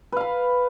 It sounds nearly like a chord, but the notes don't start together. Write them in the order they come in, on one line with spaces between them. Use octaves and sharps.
B4 F5 B5